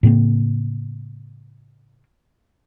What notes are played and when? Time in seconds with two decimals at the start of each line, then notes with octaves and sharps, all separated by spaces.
0.03 A2 C#3 A#3 C4